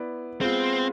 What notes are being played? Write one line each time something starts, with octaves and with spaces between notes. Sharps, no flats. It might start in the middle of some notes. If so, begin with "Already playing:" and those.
Already playing: B3 E4 B4 D5
G#3 B3 C4 F4